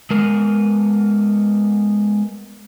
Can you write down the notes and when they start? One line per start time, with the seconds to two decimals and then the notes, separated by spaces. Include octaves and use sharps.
0.10 G#3 B3 A#4